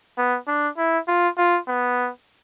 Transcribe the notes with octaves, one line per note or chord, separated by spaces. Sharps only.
B3
D4
E4
F4
F4
B3